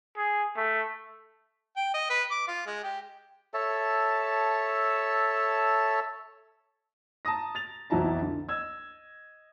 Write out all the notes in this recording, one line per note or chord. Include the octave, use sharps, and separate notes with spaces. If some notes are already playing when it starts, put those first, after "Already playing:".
G#4
A3
G5
D#5
B4
D6
F4
G#3
G4
A4 C#5 E5 A5
A5 A#5 D#6 A#6
A6 F7
B1 F2 E3 E4 A5 A#5
D3
D#5 E6 G#6